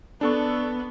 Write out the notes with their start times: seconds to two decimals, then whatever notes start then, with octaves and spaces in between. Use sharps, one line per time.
0.21 B3 D4 A4 C#6